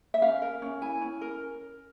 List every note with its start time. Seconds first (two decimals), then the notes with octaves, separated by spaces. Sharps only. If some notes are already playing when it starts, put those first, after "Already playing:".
0.14 E5
0.22 C#4 F5
0.42 A#4
0.62 C#4
0.81 E4 G#5
1.02 C#4
1.21 A#4